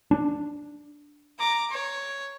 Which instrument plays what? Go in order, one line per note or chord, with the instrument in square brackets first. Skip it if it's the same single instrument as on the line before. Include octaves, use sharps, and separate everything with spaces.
[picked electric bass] D4
[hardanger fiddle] A#5 D6
C#5